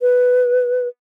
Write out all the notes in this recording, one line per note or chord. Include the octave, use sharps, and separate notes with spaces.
B4